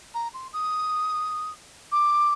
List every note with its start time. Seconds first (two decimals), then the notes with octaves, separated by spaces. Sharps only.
0.14 A#5
0.33 C6
0.53 D#6
1.91 D6